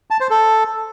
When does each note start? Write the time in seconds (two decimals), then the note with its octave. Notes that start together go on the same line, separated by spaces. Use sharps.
0.10 A5
0.20 C5
0.30 A4